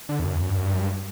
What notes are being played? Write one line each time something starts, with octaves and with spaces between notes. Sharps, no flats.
D3
E2
F#2
E2
F#2
G2
F#2
G2
F#2
G2